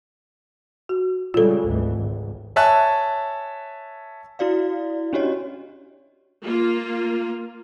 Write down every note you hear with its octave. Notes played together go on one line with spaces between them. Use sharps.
F#4
C#3 G3 G#3 F4 A4
G#1 D2 E3
G#1 C#2
C#5 E5 G#5 A5 F#6
E4 F#4 D5 F5
C#4 D4 F#4 G4 C#5 D#5
A#3 F4